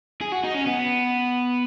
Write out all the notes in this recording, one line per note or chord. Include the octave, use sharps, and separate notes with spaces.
G#4
F#4
D#4
C#4
B3